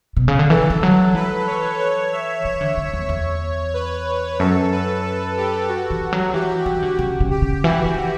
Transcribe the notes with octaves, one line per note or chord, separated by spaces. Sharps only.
B2
C#3
D3
E3 A4
E3
F#3
E3 B4
C#5
C#5
E5
E3 C#5
D3
D3
E2
E2
B4
F#2 A4
B4
A4
G4
F#4
E3
F#3
E3 G4
E3
D3
C#3
C#3
G4
C#3
E3 F#4
E3